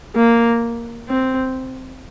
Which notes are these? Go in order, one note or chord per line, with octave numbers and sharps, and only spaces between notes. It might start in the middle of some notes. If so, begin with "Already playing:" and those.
A#3
C4